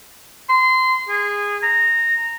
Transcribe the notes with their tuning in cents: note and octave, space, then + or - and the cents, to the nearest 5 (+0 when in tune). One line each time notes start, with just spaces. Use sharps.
C6 -25
G#4 -20
A#5 -15